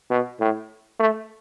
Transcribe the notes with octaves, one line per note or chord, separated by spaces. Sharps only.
B2
A2
A3